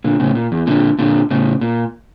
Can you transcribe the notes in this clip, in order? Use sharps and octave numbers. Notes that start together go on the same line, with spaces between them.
A#2 D3
A2 C#3
A#2
E2
A#2 D3
A#2 D3
A2 C#3
A#2